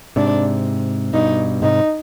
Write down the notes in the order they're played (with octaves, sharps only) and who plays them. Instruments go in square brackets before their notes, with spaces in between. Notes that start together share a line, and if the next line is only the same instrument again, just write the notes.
[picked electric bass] G#2 C3 [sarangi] D4
[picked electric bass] G2 B2 [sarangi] D#4
[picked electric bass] G#2 C3 [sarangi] D#4